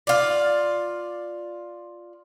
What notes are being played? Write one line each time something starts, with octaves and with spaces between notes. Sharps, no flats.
F4 D5